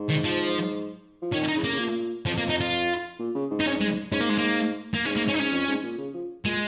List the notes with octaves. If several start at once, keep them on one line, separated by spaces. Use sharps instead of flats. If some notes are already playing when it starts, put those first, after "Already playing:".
Already playing: G#2
D#3
F3
F3
D#3 C#4
D#4
C#3
A#3
C#3
A#2
F2 F3
A#3
D#4
F4
A#2
C#3
G#2
D#4
G#2 C#4
G#3
G#2 C#4
A#3
G#3
A#3
A#3
G#2 C#4
A#3
C#4
D#4
G#2 C#4
F2
G#2
A#2
C#3
F3
A#2 G#3